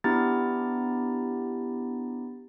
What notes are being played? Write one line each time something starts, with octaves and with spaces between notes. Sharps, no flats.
B3 D4 E4 G4 A#5 A6